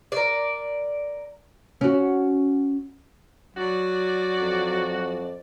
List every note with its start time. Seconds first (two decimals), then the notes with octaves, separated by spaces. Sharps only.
0.12 A#4 D5
1.81 C#4 F#4
3.57 F#3 F#4 D5
4.38 F2